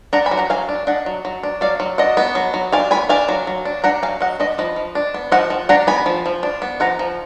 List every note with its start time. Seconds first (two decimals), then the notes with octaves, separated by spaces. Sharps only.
0.13 D4 F#5 A#5
0.26 G#5 B5
0.31 F#3
0.37 F#5 A#5
0.50 F#3 F5 G#5
0.69 D4
0.87 D4 D#5 F#5
1.06 F#3
1.25 F#3
1.43 D4
1.61 F#3 D5 F5
1.80 F#3
1.98 D4 D#5 F#5
2.17 B3
2.35 F#3
2.54 F#3
2.72 D4 F5 G#5
2.91 B3 G#5 B5
3.09 D4 F5 G#5
3.29 F#3
3.47 F#3
3.65 D4
3.84 D4 F#5 A#5
4.03 F#3 F5 G#5
4.21 F#3 D#5 F#5
4.40 D4 B4 D#5
4.58 F3 B4 D#5
4.76 F3
4.95 D4
5.14 B3
5.32 F3 D#5 F#5
5.50 F3
5.69 D4 F#5 A#5
5.87 B3 G#5 B5
6.06 F3
6.26 F3
6.43 D4
6.62 B3
6.80 F3 F#5 A#5
6.99 F3